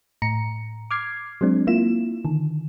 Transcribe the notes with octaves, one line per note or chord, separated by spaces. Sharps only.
A2 A#5 C#7
D6 F6 G#6 C7
F#3 G#3 C4 D4
A#3 E4 F4 E7
D3 D#3